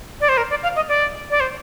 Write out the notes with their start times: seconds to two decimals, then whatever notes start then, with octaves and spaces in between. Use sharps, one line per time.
0.21 D5
0.29 C5
0.37 A#4
0.50 D5
0.63 F5
0.76 D#5
0.89 D5
1.30 D5
1.40 C5